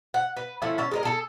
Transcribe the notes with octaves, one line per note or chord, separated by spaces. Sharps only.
F#5
B4
F3 A3 C#4 E4
C#4 A5
G#3 A#4 D#5
G#4 A4